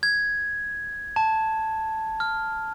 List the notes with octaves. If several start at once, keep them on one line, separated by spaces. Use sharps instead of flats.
G#6
A5
F6